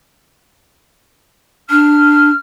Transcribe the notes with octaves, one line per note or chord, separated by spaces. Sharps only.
D4 F6